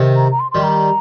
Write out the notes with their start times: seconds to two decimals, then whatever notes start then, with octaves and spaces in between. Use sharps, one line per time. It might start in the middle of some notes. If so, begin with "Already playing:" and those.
Already playing: C3 D#3
0.16 A#5
0.32 A#5
0.40 C6
0.52 D#3 G3 C6
0.63 A#5